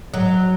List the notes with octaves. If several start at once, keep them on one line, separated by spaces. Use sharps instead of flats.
F#3